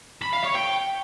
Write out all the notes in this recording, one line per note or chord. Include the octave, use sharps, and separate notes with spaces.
B5
F5
C#5
G5